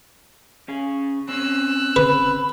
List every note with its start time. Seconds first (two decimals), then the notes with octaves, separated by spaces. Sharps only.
0.68 C#4 G#4
1.29 C4 C#4 E6 F#6
1.96 B4 B5